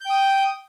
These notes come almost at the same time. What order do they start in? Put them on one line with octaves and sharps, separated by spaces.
G6 G5 D#6